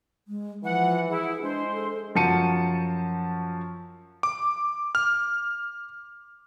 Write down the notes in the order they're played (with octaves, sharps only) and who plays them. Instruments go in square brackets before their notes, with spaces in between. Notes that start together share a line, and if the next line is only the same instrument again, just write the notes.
[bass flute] G#3
[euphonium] E3 [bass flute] F3 [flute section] F#5
[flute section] E4 [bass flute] G#4
[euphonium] G#3 [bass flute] D4 [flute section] C5
[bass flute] A4
[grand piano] F#2 F3 F#4 A5 C#7 D#7
[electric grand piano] D6
F6